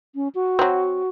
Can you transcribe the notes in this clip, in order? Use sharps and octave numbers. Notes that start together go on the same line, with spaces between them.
C#4
F#4
F#3 C4